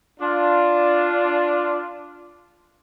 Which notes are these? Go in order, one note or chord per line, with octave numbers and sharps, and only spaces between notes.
D4 F4